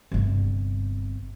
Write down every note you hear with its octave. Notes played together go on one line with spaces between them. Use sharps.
G1 C3